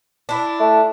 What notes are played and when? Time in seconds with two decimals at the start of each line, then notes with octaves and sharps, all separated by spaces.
0.29 D4 E4
0.60 A3